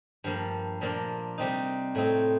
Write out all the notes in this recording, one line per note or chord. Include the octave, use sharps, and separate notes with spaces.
G2 F3 A#3
A#2 F3 A#3 D4 F4
C3 G3 C4 D#4
A2 A3 C4 D#4